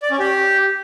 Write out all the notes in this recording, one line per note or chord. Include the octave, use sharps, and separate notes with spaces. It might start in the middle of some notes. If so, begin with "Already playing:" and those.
D5
C#4
G4